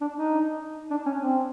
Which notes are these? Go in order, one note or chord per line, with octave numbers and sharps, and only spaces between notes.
D4
D#4
D4
C#4
C4